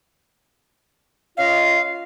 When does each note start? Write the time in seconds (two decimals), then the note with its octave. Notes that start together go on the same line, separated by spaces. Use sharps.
1.37 C#4 F4 D#5 F5